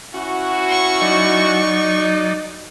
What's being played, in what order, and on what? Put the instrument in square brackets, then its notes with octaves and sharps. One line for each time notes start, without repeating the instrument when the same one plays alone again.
[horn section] C#4 E4 F#4
[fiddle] C#6
[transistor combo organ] F#3 D5 [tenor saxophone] D#4